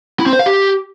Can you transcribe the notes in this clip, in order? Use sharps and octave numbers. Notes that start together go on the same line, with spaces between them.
E4
C4
C5
F5
G4